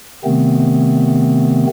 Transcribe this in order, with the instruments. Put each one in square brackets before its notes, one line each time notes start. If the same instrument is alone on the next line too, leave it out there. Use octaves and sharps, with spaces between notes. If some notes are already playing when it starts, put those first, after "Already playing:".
[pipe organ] C3 D#3 A3 B3 C4